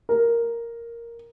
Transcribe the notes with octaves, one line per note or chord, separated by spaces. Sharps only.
A#4